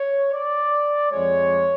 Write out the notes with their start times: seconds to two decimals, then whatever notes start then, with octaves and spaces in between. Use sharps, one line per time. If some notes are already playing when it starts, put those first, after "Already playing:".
Already playing: C#5
0.33 D5
1.10 F2 F3 G#3 C#5